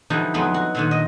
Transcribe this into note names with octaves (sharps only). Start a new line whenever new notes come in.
D3 E3 F3 G3 D#4
F2 F#3 G#3 B3 B4 B5
F#4
A#2 D3 D#3
D#5